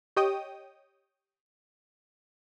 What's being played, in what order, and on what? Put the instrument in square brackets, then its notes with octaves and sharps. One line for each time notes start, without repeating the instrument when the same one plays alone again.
[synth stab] G4 C#5 D#5 G5 D#6